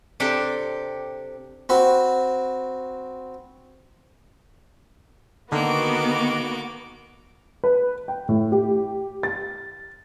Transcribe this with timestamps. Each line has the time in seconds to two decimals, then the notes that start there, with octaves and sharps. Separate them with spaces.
0.20 C3 D4 G4 A4 G5
1.69 C4 F#4 B5
5.52 D3 D#3 A#3 B3 F#4 D6
7.64 B4
8.08 G5
8.29 A2
8.52 G4
9.23 A6